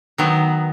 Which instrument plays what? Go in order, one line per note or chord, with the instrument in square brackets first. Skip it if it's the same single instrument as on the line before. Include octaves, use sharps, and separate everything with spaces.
[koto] D#3 F#3 B3